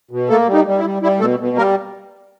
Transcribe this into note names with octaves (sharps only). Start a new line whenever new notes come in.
B2
A3 A#3 A4
G3
D#4
G3
E4
G3
G3 E4
B2 A3 A4
B2
G3 A#3 A#4